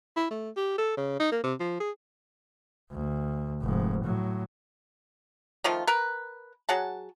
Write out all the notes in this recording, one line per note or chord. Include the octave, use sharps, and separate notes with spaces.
E4
A3
G4
A4
C#3
D#4
A#3
C3
F3
G#4
D2
F1 G#2
A2 F#3
D#3 F3 A3 F4
A#4 B4
F#3 G#4 F#5 A5